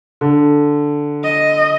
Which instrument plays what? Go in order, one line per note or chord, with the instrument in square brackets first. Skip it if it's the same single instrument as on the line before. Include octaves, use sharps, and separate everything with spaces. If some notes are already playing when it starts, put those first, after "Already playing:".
[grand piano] D3
[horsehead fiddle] D#5